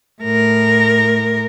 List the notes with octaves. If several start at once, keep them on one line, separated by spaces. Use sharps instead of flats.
A2 A#4